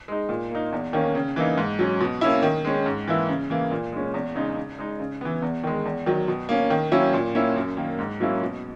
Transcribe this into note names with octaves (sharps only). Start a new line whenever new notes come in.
G#3 D#4
A#2
A#3 D#4
E2
D#3 A#3 C#4
C#3
E3 A#3 D#4
G#2
F#3 C#4
B2
A#3 C#4 E4
D#3
G#3 C#4
G#2
E3 A#3 E4
C#3
E3 A#3
A#2
G#3 C#4
E2
C#3 G#3 D#4
C#3
G#3 D#4
C#3
E3 B3
E2
D#3 G#3
E2
D#3 F#3
B2
A#3 C#4
D#3
F#3 A#3 C#4 E4
A#2
A#3 C#4 E4
F#2
D#3 A#3
G#2
F#3 A#3 C#4 E4
B2